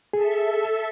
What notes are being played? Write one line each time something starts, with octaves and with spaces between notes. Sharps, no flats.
G#4 A4 E5